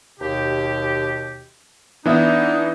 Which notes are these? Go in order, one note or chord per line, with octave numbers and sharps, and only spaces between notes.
D#2 B2 G4
E3 B3 D4 D#4 E5